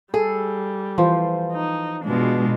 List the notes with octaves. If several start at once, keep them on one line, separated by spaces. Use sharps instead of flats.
G3 G#4 A4
E3 F3 C5
D#4
B2 G#3 D4 F4